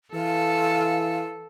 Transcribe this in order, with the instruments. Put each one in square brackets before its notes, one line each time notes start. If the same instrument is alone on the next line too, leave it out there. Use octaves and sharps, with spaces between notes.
[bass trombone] E3 [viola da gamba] A4 [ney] F5